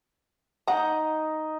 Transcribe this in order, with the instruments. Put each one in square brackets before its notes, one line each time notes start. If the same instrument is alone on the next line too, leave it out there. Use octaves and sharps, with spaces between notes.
[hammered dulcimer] D#4 D#5 [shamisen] F#5 A#5